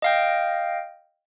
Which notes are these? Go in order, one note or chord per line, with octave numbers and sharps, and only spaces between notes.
D#5 F5 G5